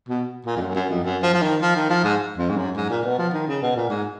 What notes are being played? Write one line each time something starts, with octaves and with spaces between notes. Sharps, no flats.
B2
A#2
F2
F#2
F#2
F2
F#2
F3
F3
D#3
F3
D#3
F3
G#2
F2
G#2
F#2
G#2
A#2
B2
F3
D#3
C#3
B2
A#2
G#2